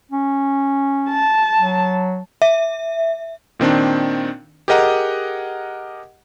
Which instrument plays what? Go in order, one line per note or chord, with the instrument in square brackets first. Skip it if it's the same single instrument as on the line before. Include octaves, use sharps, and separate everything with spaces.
[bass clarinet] C#4
[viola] A5
[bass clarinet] F#3
[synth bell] E5
[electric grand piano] A#2 D#3 C4 D4
G4 G#4 A#4 D#5 F#5 A#5